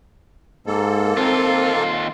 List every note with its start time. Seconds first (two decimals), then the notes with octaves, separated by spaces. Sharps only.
0.67 G#2 A#3 A4
1.17 D#2 C4 F4